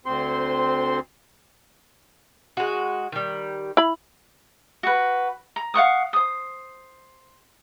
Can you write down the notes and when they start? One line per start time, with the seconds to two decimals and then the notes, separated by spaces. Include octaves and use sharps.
0.06 D2 C4 C6
2.57 G#3 F#4
3.12 D#3 G3
3.77 E4 B5
4.83 F#4 B4
5.56 A#5
5.74 F5 F#5 C#6 D#6
6.13 C5 D#6